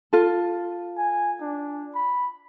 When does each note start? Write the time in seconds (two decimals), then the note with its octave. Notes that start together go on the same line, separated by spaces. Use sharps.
0.13 F4 A4
0.97 G#5
1.41 D4
1.94 B5